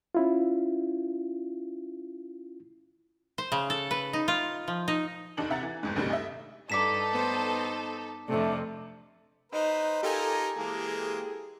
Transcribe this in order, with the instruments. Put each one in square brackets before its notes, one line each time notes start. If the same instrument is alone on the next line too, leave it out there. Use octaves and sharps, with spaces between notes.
[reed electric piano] C#4 E4 F4
[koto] C5
C#3
A4
B4
D#4
F4
F3
D#4
[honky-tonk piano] F1 D#2 D4 D#4 F#7
C3 E5 F#5 A#5 A6
E3
G1 F2 G#2
A1 D2 G2 C3 D#3 G3
D#5 E5
[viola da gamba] G2 [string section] D#4 A4 [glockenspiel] D6 B6 E7
[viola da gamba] B3 C5
[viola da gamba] F2 C3 [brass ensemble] A3 C4 D4
[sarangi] D#4 [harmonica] B4 C5
[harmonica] D#4 F4 [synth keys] G4 A4 G#5 [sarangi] A#4
[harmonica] E3 G#3 A#3 [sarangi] G#4